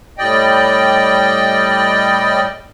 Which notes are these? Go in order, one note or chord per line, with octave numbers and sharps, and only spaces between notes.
A2 G3 D5 D#5 G5